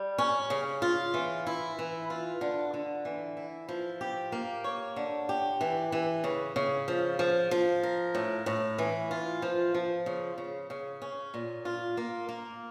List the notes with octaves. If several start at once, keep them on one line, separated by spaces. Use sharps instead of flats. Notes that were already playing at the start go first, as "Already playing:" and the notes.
Already playing: G3
C#4
C#3
F4
E3
E4
E3
F4
D3
D3
E3
E4
F3
G4
A#3
C#5
D3
G4
E3
E3
C#3
C#3
F3
F3
F3
A#4
A2
A2
E3
F4
F3
F3
C#3
C#3
C#3
C#4
A#2
F4
A#3
A#3